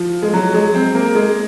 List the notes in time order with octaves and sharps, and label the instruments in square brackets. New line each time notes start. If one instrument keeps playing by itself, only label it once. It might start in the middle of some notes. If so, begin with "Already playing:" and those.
Already playing: [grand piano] F3
G#3
F#3
G#3
C4
A#3
G#3